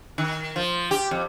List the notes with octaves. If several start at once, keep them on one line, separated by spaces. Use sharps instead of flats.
D#3
F3
G4
F2